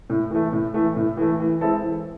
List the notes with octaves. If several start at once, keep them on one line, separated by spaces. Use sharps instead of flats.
A2
E3 A3
A2
E3 A3
A2
E3 A3
E3
G#3 C4 E4 A4
E3